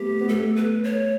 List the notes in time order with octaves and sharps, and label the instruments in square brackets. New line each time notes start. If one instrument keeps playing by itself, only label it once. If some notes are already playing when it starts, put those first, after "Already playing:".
Already playing: [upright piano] A3 B3 [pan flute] G4
[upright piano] B3
[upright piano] A3 [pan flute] A4
[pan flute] B4
C#5